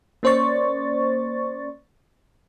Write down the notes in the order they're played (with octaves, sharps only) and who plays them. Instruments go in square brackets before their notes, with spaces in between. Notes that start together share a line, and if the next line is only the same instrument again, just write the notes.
[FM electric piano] A#3 C#4 C5 D5 C#6 A6